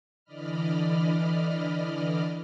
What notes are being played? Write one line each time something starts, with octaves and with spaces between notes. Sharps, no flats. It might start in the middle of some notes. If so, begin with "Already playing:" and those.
D3 E3 D5 D#5 B5 F6